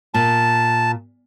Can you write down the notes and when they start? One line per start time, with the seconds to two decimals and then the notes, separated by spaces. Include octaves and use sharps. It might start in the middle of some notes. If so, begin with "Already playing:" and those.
0.14 A#2 A5